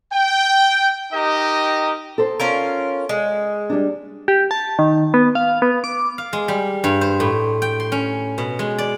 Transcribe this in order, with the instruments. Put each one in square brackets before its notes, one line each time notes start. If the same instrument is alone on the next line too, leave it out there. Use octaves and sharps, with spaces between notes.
[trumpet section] G5
D#4 G4 A#4 D#5 G5 A#5
[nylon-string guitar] A4 C5
[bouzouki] C#4 F4 A#4
G#3
[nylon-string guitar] G3 D4
[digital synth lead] G4
A5
D#3
B3
F5
B3
D6
[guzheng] F5
G#3
G3
G2
C5
A2
G5
C6
C#4
B2
G#3
D5